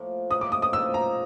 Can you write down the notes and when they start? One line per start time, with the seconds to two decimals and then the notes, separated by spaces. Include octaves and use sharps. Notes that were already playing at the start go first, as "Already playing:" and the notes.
Already playing: A2 F3 A#3
0.30 A2 F3 A#3 D#4 D#6
0.41 D6
0.52 D#6
0.62 D#6
0.73 A2 F3 A#3 D#4 E6
0.94 A#5